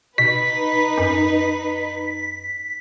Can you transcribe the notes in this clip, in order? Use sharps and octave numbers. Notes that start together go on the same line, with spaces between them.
B2 D#4 B4 B6
F#2